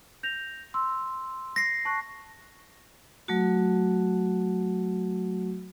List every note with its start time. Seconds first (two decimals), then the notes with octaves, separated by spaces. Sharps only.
0.23 G6 A#6 F7
0.74 C6 E6
1.56 A#6 C7
1.85 A5 C#6 F#6
3.28 F#3 A3 F#4